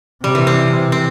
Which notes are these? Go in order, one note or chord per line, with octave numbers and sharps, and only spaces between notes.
C3 G3
E3
C4
C4